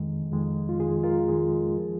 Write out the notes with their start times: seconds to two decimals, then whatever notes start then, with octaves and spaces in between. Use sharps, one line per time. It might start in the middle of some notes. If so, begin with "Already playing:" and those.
Already playing: F2 D#3 G#3
0.32 F2 D#3 G#3
0.69 F4
0.80 F2 D#3 G#3 G#4
1.03 F4 A#4
1.28 F2 D#3 G#3 G#4
1.77 F3 G#3